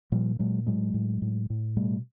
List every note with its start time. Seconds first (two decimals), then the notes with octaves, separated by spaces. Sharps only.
0.12 A#2 F3 G3
0.39 A#2 F#3 G#3
0.66 A2 F#3 G#3
0.94 A2
1.22 A2
1.50 A2
1.77 B2 G3 A3